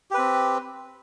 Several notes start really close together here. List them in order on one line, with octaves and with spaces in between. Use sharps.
G4 B4 C4